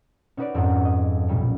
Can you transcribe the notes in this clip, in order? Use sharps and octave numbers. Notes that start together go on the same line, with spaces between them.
C#4 D#4 F#4 B4 C#5 D5
F2 G#2 C4 F4 D#5 F#5
D#5
B1 A#2 F#3 G3 C#4